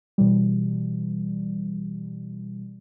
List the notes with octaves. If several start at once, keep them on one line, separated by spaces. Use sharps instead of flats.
B2 E3 G3